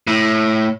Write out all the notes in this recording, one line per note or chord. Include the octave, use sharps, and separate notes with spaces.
A2